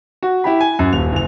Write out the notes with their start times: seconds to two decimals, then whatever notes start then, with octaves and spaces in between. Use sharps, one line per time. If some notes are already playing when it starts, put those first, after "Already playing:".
0.23 F#4
0.44 E4 G4 B5
0.61 G#5
0.79 F#2
0.93 D#1 F7
1.13 F#1 F7